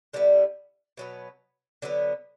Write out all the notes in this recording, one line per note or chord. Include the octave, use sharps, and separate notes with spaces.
D3 G3 B3 E4
B2 F#3 B3
D3 F#3 B3